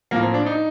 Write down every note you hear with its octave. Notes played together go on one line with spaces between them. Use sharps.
A2 F3 A#3
C4
D4
D#4